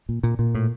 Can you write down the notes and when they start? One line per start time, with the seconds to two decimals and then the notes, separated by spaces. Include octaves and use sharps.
0.09 A#2
0.23 A#2
0.39 A#2
0.55 A2